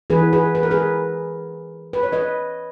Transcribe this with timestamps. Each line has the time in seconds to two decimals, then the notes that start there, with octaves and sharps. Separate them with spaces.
0.10 E3 B3 D#4 G#4 B4
0.33 G#4 B4
0.55 B4
0.63 A#4
0.71 G#4 B4
1.93 B4
2.03 C#5
2.12 B4 D#5